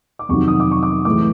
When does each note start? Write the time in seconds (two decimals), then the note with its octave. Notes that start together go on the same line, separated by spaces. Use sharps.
0.19 D6
0.29 F2 C3 D#3 F#3 C#6
0.48 D#6
0.60 D6
0.71 C#6
0.83 D6
1.05 A2 E3 G#3 D6